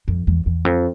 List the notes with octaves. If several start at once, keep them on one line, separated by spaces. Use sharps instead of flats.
F2
E2
E2
F2